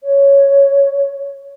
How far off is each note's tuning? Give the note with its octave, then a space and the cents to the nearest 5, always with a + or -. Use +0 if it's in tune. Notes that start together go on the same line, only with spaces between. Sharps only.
C#5 +0